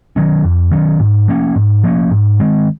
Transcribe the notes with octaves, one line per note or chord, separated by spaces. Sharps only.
D#3 F#3 C#4
F2
D#3 F#3 C#4
G#2
F3 A#3 C#4
G#2
F3 A#3 C#4
G#2
D#3 G#3 C4